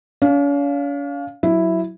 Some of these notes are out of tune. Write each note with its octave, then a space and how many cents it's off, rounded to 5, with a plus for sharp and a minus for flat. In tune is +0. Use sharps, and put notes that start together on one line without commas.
C#4 +45 F5 +0
F#3 +0 E4 +0